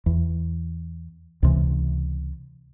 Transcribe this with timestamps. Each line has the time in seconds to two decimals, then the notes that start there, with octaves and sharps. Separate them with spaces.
0.06 E2
1.43 C#2 C3 E3